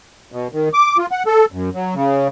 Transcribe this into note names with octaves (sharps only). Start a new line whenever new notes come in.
B2
D#3
D6
F4
F#5
A4
F#2
F#3
C#3